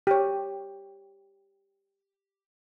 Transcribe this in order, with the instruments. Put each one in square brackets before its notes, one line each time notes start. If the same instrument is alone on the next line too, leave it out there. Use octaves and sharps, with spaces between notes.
[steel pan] G4 C#5